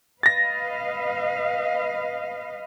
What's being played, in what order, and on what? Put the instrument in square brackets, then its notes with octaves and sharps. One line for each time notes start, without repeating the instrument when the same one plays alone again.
[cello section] B4 D#5 F5 [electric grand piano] A6 A#6